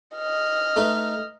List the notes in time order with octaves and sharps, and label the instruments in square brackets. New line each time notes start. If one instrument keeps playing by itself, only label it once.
[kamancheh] D#5 F6
[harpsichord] A3 D#4 B4